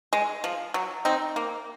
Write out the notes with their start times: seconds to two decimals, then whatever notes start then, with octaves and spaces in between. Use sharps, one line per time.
0.13 G#3
0.44 F3
0.74 F#3
1.05 C4 D#4
1.36 A#3